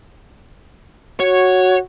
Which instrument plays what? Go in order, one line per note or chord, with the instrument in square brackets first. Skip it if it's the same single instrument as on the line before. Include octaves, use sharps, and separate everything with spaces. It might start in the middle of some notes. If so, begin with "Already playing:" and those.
[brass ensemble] F#4 [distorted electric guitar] C#5